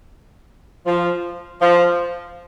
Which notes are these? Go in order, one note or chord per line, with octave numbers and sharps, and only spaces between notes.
F3
F3